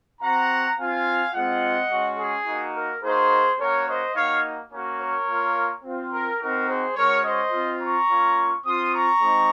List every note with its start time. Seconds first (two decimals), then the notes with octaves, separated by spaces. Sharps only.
0.20 C4 F#4 F#5 A#5
0.77 C4 F4 F5 G#5
1.33 G#3 C4 F4 D#5 F#5
1.89 G#3 C#4 F#4
2.17 G#4
2.46 A#3 D#4 F#4
2.73 A#4
3.01 A#3 D#4 F#4 G#4 C5
3.58 A#3 C#4 F#4 A#4 C#5
3.87 C5 D#5
4.14 A#3 D#4 F#4 C#5 F5
4.71 A#3 C#4 F#4
4.99 A#4 C#5
5.26 A#3 F4
5.83 C4 F4
6.11 A#4
6.39 C4 D#4 F#4 A#4
6.67 G#4 C5
6.95 G#3 C#4 F#4 A#4 C#5
7.23 C5 D#5
7.51 C4 F4
7.80 A#5 C#6
8.08 A#3 C#4 F4
8.64 C4 F4 C6 D#6
8.92 A#5 C#6
9.21 G#3 C4 D#4